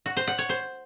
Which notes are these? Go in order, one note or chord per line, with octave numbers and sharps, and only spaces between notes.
F#4
C5
F#5
C#5
C5